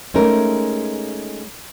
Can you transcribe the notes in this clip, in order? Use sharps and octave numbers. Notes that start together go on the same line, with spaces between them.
G#3 A3 C#4 D#4 A#4